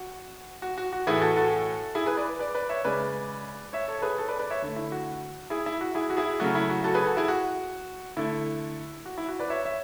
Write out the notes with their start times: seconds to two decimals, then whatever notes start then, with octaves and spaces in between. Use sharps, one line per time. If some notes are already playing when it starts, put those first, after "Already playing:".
Already playing: F#4
0.62 F#4
0.78 F#4
0.93 F#4
1.07 A2 E3 A3 E4 G#4
1.21 F#4 A4
1.36 F#4 A4
1.95 E4 G#4
2.06 G#4 B4
2.17 B4 D5
2.39 B4 D5
2.55 B4 D5
2.69 C#5 E5
2.85 C#3 G#3 B4 D5
3.73 C#5 E5
3.88 A4 C#5
3.99 A4
4.02 G#4 B4
4.18 A4 C#5
4.28 B4 D5
4.39 B4 D5
4.50 C#5 E5
4.62 D3 A3
4.76 E4
4.92 F#4
5.50 E4 G#4
5.66 E4
5.81 F#4
5.95 E4 G#4
6.10 F#4
6.17 E4 G#4
6.40 C#3 F#3 A3 F#4
6.55 E4
6.70 F#4
6.84 F#4 A4
6.95 G#4 B4
7.06 F#4 A4
7.17 E4 G#4
7.28 F#4
8.17 D3 A3 E4
9.06 F#4
9.18 E4
9.28 F#4
9.39 B4 D5
9.50 C#5 E5
9.65 C#5 E5